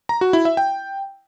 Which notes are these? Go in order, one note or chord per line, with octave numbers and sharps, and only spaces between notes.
A#5
F#4
E4
E5
G5